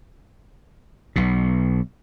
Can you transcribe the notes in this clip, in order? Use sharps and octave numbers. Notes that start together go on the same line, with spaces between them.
B1 B2